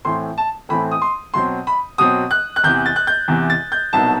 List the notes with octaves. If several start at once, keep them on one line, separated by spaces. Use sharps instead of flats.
A2 E3 A3 C4 C6
A5
A2 E3 A3 C4 B5
D#6
C6
B2 F#3 C4 C6
B5
B2 F#3 C4 D#6
F#6
F#6
E2 C3 E3 G6
A6
F#6
G6
E2 C3 E3
A6
G6
C2 B2 F#3 B3 D#4 A5